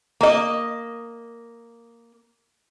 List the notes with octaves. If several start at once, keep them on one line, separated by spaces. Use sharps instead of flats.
A#3 D#5